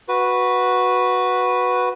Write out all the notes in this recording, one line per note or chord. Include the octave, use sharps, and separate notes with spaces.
F#4 B4